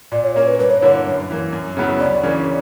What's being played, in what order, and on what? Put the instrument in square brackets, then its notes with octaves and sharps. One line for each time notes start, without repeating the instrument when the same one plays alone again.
[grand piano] A#2 [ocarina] D5
[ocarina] C#5
[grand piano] A#3 C#4 [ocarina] C#5
[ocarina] B4
[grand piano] G2 [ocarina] B4
[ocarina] C#5
[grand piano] D3 A#3 E4 [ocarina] C#5
[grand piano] F#2
E3 A#3
F#2
C#3 F#3 B3 E4
[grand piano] D2 [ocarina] D5
[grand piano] C#3 E3 A#3 C#4